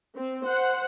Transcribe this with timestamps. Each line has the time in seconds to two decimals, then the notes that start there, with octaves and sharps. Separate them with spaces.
0.15 C4
0.45 C5 F#5